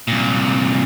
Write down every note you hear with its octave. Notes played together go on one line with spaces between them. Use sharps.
C2 A#2